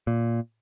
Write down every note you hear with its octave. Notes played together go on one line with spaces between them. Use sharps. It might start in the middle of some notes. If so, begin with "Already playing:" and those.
A#2